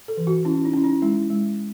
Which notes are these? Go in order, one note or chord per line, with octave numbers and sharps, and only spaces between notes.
A4
E3
F#4
C#4 E4
D#4
C#4 E4
D#4
G#3 E4
G#3